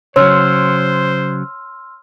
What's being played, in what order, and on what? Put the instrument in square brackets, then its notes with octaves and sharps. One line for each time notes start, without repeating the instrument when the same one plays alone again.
[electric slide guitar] C#3 F#3 [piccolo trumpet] C5 [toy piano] C#5 [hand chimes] C6 E6 F6